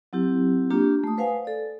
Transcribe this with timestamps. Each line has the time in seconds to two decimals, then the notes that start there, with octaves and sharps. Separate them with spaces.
0.13 F#3 C4 E4 G4
0.71 A#3 D4 F4 G4
1.04 A3 D#6
1.18 B4 C5 F5 F#5 G#5
1.45 A4 D5